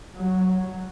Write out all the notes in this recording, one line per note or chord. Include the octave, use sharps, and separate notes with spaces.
F#3